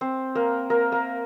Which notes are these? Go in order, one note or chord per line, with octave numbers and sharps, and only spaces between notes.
C4 C5
A#3 A#4
A#3 A#4
A#3 A#4